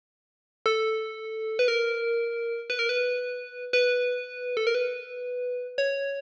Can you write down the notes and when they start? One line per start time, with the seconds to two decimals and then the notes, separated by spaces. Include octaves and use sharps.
0.66 A4
1.59 B4
1.68 A#4
2.70 B4
2.79 A#4
2.89 B4
3.73 B4
4.57 A4
4.67 A#4
4.75 B4
5.78 C#5